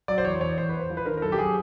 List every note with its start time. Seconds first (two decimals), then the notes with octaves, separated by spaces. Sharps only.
0.08 F#3 D5
0.18 C5
0.24 E2 C#5
0.41 E2 C#5
0.58 E2 C5
0.69 E2 B4
0.80 C5
0.90 F3
0.97 B4
1.06 D#3 A#4
1.17 A#4
1.22 F#2 A4
1.32 G4
1.38 F#3 G#4